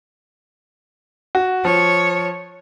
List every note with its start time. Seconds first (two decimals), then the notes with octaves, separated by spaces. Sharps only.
1.35 F#4
1.65 F3 C#5